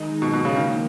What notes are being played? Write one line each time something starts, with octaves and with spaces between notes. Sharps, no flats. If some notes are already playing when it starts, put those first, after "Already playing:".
Already playing: D#3 G#3 D#4
B2
B2
C#3
D#3 F3 A#3